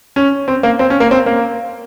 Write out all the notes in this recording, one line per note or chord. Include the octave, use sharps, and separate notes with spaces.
C#4
C4
A#3
C4
C#4
A#3
C4
A#3